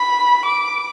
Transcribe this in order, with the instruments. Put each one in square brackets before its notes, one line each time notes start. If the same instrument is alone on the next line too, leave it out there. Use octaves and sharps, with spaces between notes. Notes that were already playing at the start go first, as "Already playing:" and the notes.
Already playing: [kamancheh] B5
D6